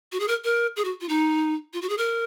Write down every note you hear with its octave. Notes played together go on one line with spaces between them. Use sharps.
F#4
G#4
A#4
A#4
G#4
F#4
F4
D#4
F4
F#4
G#4
A#4